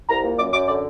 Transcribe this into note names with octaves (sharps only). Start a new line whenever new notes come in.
C2 A#5
A#2
F#2 D6
F#2 D6
D3 D6